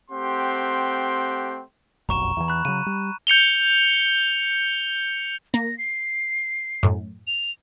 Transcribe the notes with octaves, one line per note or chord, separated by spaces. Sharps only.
A3 C4 G4 F#5 G5 C6
F1 B1 F#2 A#5 C#6 E7
E2 E3
B5 F#6
C#3 F#3 D#7
G3
G6 C#7 F7 G7
A#3 A#6
C7
F#2 A2
F7